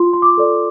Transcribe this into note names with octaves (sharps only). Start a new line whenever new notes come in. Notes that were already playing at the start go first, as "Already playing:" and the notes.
Already playing: F4 C6
C6
D6
A4 D5